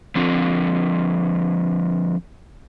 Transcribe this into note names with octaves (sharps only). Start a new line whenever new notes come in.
D3 F3 C4